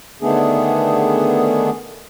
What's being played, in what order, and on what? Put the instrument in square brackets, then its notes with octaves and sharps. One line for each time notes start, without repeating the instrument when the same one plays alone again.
[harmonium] D3 D#3 A3 B3 D4 G#4